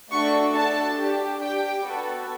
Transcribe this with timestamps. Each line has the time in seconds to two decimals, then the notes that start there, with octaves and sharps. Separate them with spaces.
0.12 A3 D4 F#4 A4 C#6
0.55 D4 F#4 A4 A5
0.99 D4 G4
1.42 D4 G4 G5
1.86 B3 F#4 A4